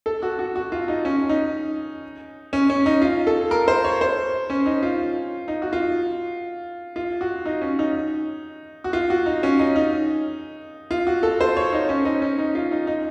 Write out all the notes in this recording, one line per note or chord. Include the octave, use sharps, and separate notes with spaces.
A4
F#4
F#4
F#4
F4
D#4
C#4
D#4
C#4
C#4
D#4
F4
A4
A#4
C5
C#5
C5
C#4
D#4
F4
D#4
F#4
F4
F4
F#4
D#4
C#4
D#4
F#4
F4
F#4
D#4
C#4
D#4
D#4
F4
F#4
A4
C5
C#5
D#4
C#4
D#4
C#4
D#4
F4
D#4
D#4